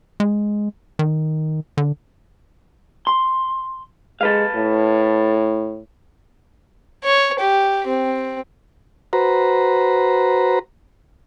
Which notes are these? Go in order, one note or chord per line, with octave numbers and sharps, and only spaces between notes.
G#3
D#3
D3
C6
G#3 A4 B4 F5
A2
C#5
G4
C4
F#4 B4 C5 A#5